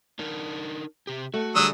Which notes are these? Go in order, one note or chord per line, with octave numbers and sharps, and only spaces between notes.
D4 D#4 A#4
C3 G4
A3 F#4
D3 F#3 G3 G#4 D#6 E6